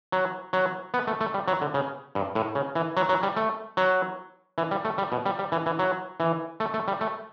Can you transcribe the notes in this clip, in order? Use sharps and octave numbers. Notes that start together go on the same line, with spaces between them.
F#3
F#3
B3
A3
A3
G3
F#3
D3
C#3
G2
A2
C#3
E3
F#3
F#3
G3
A3
F#3
E3
G3
A3
G3
B2
G3
G3
E3
E3
F#3
E3
A3
A3
G3
A3